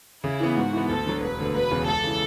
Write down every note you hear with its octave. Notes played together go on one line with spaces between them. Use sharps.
C#3 E4
E3 B3
G#2 F#4
E3 B3
D2 A4
D3 F#3
E1 B4
D2 D3
E1 B4
E2 C#3
C#2 A4
C#3 E3